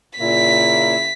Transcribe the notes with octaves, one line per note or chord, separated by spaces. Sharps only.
A#2 C#3 A#3 E4 B6